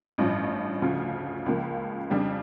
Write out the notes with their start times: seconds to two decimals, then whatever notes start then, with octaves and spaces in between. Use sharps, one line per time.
0.18 A1 G2 F3 C#4
0.82 D2 C#3 F3
1.46 C#2 C#3 F3 A#3
2.10 F2 C#3 G3 D4